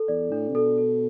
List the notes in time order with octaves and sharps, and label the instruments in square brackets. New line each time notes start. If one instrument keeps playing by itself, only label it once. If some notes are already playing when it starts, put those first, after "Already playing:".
Already playing: [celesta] A4
[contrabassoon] E2 [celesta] D5
[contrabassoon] A2 [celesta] D4
[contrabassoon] C3
[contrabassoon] B2 [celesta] A4
[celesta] A4